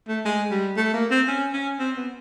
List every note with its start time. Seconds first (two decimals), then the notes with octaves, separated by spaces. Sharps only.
0.08 A3
0.25 G#3
0.51 G3
0.77 A3
0.93 A#3
1.11 C4
1.28 C#4
1.53 C#4
1.79 C4
1.96 B3